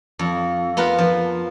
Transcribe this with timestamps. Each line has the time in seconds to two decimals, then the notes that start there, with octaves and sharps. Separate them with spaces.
0.19 F2
0.77 B3 F4 A#4 B4
0.98 F3